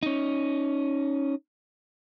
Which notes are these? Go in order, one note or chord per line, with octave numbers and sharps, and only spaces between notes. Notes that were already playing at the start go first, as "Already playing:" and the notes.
C#4 D#4